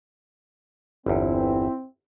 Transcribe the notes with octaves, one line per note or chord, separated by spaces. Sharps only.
G1 E2 C4 E4